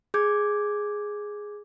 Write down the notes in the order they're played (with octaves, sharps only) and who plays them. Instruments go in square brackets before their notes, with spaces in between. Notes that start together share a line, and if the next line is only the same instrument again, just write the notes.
[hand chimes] G#4 D6 G6 G#6